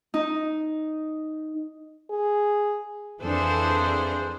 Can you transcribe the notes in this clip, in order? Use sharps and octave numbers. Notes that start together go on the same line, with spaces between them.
D#4
G#4
F2 E3 D4 G#4 A4 C5